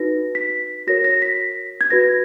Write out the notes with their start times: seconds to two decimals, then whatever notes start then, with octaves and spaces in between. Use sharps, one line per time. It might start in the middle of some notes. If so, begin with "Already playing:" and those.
Already playing: D#4 F#4 B4 A#6
0.35 B6
0.87 F#4 A#4 C#5 A#6
1.04 A#6
1.22 B6
1.81 G#6
1.90 F#4 B4 A#6